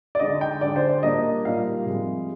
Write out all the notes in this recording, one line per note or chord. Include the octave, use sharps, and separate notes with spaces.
D5
D3 G#3 D#4 D#5
G5
D3 G#3 D4 D5
C5
D5
A#2 G3 A#3 D4 D#5
A#2 G3 A#3 D#4 F5
C3 F3 G#3